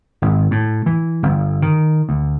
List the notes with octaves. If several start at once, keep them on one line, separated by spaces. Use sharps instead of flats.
G#1
A2
E3
G1
D#3
D2